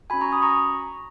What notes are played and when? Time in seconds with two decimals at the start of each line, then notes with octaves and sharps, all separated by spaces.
0.10 C#4 F#4 G#5 B5
0.21 A#5 C#6
0.32 B5 D#6
0.42 A#5 C#6